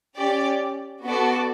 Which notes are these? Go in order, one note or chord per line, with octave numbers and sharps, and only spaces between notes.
C#4 G4 D5
B3 F#4 A4 D5 A5